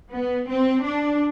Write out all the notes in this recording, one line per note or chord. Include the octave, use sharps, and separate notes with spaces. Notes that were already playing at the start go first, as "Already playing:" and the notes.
B3
C4
D4